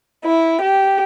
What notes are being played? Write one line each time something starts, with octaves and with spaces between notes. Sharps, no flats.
E4
G4